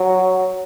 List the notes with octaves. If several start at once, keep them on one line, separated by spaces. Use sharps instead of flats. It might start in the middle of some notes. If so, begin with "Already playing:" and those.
Already playing: F#3